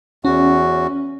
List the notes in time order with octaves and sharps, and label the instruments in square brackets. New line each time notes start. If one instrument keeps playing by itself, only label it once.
[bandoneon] E2 F#4 [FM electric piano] C#4